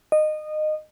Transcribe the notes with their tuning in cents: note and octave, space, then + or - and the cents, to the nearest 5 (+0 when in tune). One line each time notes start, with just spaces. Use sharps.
D#5 -20